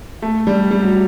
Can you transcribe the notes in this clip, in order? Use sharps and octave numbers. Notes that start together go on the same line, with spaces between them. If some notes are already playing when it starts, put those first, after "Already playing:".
A3
G3
G3
F#3